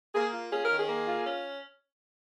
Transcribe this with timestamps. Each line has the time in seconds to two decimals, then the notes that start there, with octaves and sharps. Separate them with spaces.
0.13 A#3 G#4
0.32 F4
0.51 C#4 G#4
0.65 D#3 A#4
0.78 G#4
0.88 A#3
1.07 F4
1.26 C#4